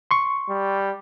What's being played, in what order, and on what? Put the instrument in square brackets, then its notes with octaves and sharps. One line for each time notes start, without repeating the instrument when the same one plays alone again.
[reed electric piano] C6 C#6
[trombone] G3